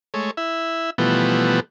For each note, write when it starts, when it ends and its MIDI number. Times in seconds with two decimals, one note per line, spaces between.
0.14 0.31 56
0.14 0.31 57
0.14 0.31 73
0.37 0.90 64
0.37 0.90 76
0.98 1.60 47
0.98 1.60 52
0.98 1.60 53
0.98 1.60 55
0.98 1.60 57
0.98 1.60 59